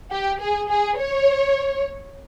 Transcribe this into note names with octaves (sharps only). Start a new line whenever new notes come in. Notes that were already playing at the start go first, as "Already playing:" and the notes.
G4
G#4
G#4
C#5